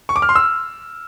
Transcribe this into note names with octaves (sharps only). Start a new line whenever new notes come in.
C#6
D6
F6
C6
E6